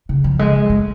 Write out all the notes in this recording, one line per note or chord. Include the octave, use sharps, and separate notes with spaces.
C#3
F3
G#3
A3